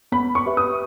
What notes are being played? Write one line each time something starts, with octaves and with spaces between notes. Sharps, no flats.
B3 B5
C#6
G4 B4 E5
D#6